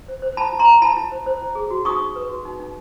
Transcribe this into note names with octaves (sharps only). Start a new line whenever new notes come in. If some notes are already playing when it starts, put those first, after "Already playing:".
C5
C5
E4 A5 B5
E4
A#5 C6
E4
E4 A5 B5
E4
C5
C5
E4
G#4
F#4
D#4 C#6 D#6
D#4
B4
F#4
D#4
D#4